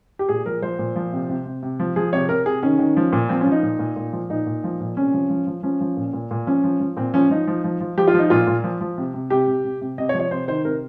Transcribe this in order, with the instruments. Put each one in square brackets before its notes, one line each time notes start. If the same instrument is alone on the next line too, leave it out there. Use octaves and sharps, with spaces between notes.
[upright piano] G4
A#2 G#4
F3 A#4
F3 C5
A#2
F3
C3
C3
C3
C3
F3
F3 G#4
C3 C#5
C3 A#4
C3 G#4
D#3 C#4
D#3
F3
A#2
F3 C4
C#4
F3
D#4
A#2
A#2
A#2
F3
A#2 D#4
A#2
F3
A#2
C3 C#4
F3
F3
F3
F3 C#4
F3
A#2
A#2
A#2
F3 C#4
F3
F3
A#2 C4
F3 C#4
F3 D#4
F3
F3
F3
F3 G4
F4
F3 D#4
A#2 F4
A#2
F3
F3
C3
C3
C3 G4
C3
C3
C3
C3 D#5
C#5
F3
C#5
C3 C5
D#3 C5
C3 A#4